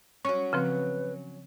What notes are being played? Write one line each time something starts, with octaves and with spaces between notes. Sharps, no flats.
F#3 C#4 C#6
C#3 F3 C4 B4